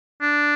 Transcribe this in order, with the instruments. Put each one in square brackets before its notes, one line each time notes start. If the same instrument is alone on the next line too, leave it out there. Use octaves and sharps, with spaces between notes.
[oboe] D4